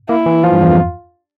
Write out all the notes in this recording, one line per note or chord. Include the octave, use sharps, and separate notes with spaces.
A#3 E4
E3
F3 F4
G2
E2
F2